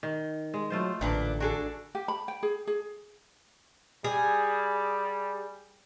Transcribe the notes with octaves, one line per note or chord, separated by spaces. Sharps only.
D#3
G#3
F#3 A3 F4 C5
A1 A#2 D3 D4 B4
D4 F#4 G#4 A4
G4
B5
G5
G#4
G#4
G3 G#4